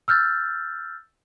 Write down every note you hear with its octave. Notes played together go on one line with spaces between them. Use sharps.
E6 F6 G6 A6